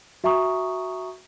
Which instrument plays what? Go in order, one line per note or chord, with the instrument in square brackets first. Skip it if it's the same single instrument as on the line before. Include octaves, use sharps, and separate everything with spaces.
[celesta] F#4 E5 G#5 A#5 C#6 D#6